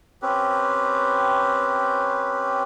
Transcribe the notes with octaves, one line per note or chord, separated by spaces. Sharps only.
C4 C#4 G4 B4